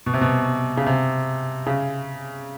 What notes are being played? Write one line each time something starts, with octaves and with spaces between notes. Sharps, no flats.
B2
C3
B2
C#3
C3
C#3